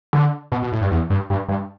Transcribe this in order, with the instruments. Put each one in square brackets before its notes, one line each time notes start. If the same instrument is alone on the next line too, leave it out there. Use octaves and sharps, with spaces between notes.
[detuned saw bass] D3
B2
B2
A2
G2
E2
G2
G2
G2